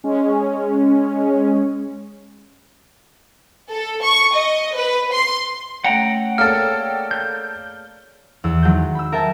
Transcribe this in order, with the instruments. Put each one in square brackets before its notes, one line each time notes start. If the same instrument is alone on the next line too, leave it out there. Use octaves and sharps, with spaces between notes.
[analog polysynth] G#3 C#4
[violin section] A4
C#6
D#5
B4
C6
[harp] A3 C#4 [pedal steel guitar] F#5 G5 A#5 [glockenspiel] D7
[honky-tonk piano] A#3 A4 [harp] G#4 C#5 D5 [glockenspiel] F6
[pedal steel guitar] G6
[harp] E2 E6
D#3 F#3 G#3 G6
B5 E6
A#4 E5 G5 A5